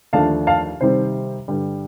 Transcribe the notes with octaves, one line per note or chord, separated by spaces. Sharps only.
D#2 D3 F3 A3 D4 F5 A5
F5 A5
C3 D#3 G3 C4 C5
G2 D3 G3 D4